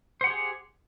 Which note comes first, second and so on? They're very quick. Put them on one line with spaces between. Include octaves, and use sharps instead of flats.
C5 F#5 G4 G#4